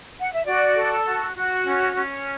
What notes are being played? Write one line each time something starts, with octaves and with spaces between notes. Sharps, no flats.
F#5
E5
F#4 D5
A4
F#4
F#4
C#4
C#4